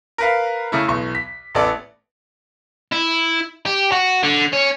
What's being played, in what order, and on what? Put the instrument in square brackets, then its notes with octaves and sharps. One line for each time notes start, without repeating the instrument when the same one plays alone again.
[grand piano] A#4 B4 F5
C#3 A3 E4
B1 E3 C#6
B6
A1 B3 A4 D5
[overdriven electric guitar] E4
G4
F#4
D3
C#4